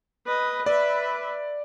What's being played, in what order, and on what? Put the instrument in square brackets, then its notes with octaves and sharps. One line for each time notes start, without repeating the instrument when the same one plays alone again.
[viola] B4 D#5
[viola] B4 E5 [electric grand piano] D5